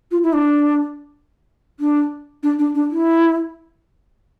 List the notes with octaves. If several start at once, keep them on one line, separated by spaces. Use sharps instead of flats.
F4
E4
D4
D4
D4
D4
D4
E4